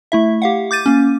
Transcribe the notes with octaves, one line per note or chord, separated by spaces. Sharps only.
A3 E4 E5
G4 F5 F#5
D6 G6 A6 D#7
A#3 C#4